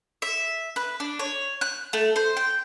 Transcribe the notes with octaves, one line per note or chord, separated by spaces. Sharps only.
E5
B4
D4
C#5
F#6
A3
C5
G5